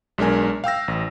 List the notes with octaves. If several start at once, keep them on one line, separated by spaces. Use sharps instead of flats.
B1 G#3 D4 A#4 G#5
F5 G5 E6 A#6
A1